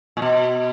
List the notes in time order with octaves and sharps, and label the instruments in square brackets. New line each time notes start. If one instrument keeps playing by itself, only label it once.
[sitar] A#2
B2